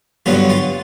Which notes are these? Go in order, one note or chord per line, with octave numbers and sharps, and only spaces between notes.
G2 D3 F#3 B3 F4
F4